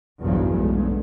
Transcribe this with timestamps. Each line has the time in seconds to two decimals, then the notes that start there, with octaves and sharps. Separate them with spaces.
0.20 B1 E2 G2 C#3 F3 F#3
0.53 B1 G2 G#3 A3 B3